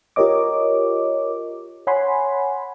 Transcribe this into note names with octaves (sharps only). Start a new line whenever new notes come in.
F4 G4 A#4 C#5 D#5 D6
C#5 F#5 G#5 B5 C6